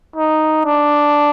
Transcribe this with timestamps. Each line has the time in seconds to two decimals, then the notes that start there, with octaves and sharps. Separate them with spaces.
0.16 D#4
0.66 D4